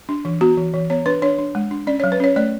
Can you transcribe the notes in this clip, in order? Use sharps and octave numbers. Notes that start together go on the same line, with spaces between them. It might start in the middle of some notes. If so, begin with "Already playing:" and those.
D4
E3
B3 F#4
E3
E3
B3 C#5
D4 B4
D4 C#5
D4
G#3
D4
C#4 D5
F#3 C#5
B4
C#4 C#5
A3 D5